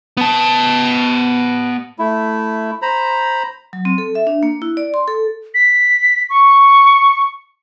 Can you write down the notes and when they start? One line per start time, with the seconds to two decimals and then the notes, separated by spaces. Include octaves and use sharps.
0.17 B3 A5
1.99 A3 E4
2.82 C5 A#5 B5
3.73 F#3
3.85 C4
3.98 A4
4.15 E5
4.27 D4
4.43 A#3
4.62 E4
4.77 D5
4.94 C6
5.08 A4
5.54 B6
6.30 C#6